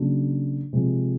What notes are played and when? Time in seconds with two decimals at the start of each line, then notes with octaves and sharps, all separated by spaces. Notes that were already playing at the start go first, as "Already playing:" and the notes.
Already playing: C#3 F#3 A#3 D4
0.73 C3 F3 G#3